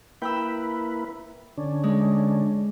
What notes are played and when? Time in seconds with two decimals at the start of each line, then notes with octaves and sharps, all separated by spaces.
0.22 A#3 E4 B4 G5 B5 E6
1.58 D3 C#4 D4
1.83 G#3